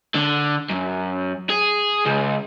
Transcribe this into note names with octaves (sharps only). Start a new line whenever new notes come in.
D3
F#2
G#4
C#2